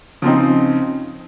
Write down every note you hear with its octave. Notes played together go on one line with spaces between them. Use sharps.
C#3 F3 C4 D#4